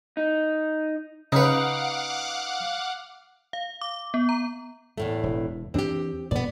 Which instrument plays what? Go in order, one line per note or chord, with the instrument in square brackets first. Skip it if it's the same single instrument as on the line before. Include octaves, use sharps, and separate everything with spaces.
[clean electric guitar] D#4
[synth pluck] C#3 [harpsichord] D#4 B4 [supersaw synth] F5 F#5 D6
[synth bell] F5
D6
B3
A#5
[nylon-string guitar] E2 A2 A3
[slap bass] E1
[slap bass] E2 E3 D4 [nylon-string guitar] C4 G4
[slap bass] E1 G2 A#2 [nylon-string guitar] B3 D5